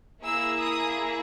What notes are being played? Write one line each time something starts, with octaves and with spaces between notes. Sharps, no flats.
A#3 E4 G#4 E6
D#6